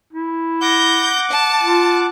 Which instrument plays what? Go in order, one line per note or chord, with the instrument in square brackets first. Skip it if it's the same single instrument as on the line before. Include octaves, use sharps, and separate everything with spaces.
[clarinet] E4
[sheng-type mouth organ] F#5 D6 [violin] G6 A#6
[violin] A5
[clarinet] F4